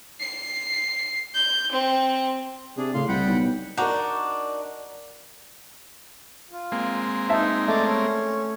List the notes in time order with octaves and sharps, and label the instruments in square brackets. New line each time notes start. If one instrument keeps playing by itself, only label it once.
[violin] C7
G6
C4
[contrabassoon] C3 [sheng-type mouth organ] D4 G#4
[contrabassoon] A2 [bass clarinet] C#3 [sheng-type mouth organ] F5 C6
[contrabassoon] C2 [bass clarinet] G3 [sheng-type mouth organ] F#5 G5 B5
[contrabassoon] B1
[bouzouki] D4 D#4 F#4 [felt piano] A#4 D5 F#5
[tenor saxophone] F4
[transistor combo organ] G#3 A#3 C4
[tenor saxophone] D#4 [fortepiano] E5 A5
[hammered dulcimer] A3 [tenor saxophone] D5
[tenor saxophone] C#4